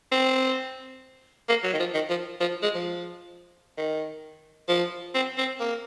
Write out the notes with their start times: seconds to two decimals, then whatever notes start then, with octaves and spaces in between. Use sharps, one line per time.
0.12 C4
1.48 A#3
1.64 F#3
1.73 D#3
1.79 F3
1.94 D#3
2.09 F3
2.40 F3
2.63 G#3
2.74 F3
3.78 D#3
4.68 F3
5.14 C4
5.38 C4
5.60 A#3